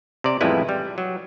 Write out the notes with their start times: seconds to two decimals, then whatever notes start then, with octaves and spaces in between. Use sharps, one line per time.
0.24 C3 D5
0.41 A1 F2 G3 G#3 E4 B4
0.69 G3
0.98 F#3